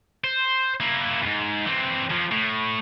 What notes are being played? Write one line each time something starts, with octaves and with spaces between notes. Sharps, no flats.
C5
A#3 E4
E2 G#2
E3 C4
F2 F3
A2